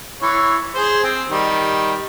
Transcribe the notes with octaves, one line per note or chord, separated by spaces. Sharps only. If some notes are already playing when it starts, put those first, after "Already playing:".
E3 C#5
G#4 C5
C4
D#3 G3